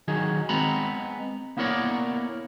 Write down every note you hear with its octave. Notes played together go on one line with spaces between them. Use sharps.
D#3 F#3 G#4
G#3 B3 C4 A#5 B5
A#3 B3 E4 A#4 C#5 D5